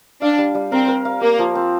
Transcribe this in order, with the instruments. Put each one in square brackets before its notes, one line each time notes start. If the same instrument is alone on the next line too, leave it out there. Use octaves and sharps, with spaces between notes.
[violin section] D4 [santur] F5
[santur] G3
G3
[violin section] C4 [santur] A#4
[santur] A#4
F5
[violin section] A#3 [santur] G4
[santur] F3
C4